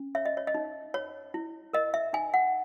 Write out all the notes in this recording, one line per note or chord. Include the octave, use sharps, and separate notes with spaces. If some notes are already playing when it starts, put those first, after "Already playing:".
Already playing: C#4
C#5 E5
D#5
C#5
D#5
D#4
C#5
E4
A#4 D#5
E5
D#4 G#5
F#5